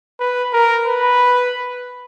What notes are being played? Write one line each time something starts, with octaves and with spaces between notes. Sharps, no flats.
B4
A#4
B4